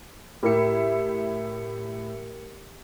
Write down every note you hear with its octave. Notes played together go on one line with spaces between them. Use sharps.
A2 E4 G4 A#4 E5 C#7